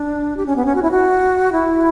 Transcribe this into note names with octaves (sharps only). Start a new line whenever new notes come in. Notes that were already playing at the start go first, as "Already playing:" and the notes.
Already playing: D4
G4
C#4
B3
C#4
F#4
E4
F#4
E4